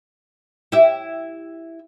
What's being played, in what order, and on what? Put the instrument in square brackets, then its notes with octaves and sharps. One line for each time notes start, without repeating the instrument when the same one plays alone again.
[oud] E4 G4 E5